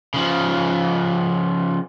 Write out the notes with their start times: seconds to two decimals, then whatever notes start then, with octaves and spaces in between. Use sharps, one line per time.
0.14 C#3 F3